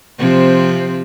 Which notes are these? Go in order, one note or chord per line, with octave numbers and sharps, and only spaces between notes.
C3 F3 C4